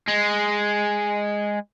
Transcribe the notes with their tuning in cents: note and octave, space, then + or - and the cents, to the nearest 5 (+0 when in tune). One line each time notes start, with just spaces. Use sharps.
G#3 -5